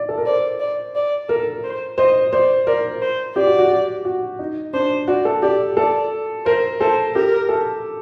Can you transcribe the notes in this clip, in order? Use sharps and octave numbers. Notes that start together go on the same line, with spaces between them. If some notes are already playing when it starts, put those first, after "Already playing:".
Already playing: D5
A4
A#4
C5 D5
D5
D5
A4 A#4
C5
C5 D#5
C5 D5
A#4 D5
C5
G4 D5
F#4
F#4
G4
F#4
D#4
D4 C5
F#4 D5
A4
G4 D5
A4 D5
A#4 C5
A4 C5
G4 A#4
A4